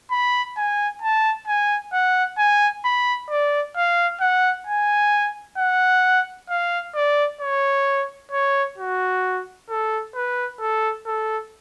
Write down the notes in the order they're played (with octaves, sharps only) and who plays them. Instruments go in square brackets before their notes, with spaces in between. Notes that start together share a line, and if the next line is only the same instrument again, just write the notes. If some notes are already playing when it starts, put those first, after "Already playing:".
[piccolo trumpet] B5
G#5
A5
G#5
F#5
G#5
B5
D5
F5
F#5
G#5
F#5
F5
D5
C#5
C#5
F#4
A4
B4
A4
A4